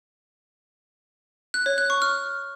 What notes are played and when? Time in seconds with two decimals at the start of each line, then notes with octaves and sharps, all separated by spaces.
1.54 F#6
1.66 C#5
1.78 F#6
1.90 C#6
2.02 F6